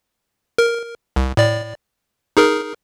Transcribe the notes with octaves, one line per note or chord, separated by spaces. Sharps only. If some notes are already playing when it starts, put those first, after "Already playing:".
A#4
C2
A2 D5
D#4 G#4 A#4